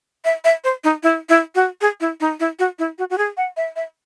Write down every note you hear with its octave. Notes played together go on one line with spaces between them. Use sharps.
E5
E5
C5
D#4
E4
E4
F#4
G#4
E4
D#4
E4
F#4
E4
F#4
F#4
G#4
F#5
E5
E5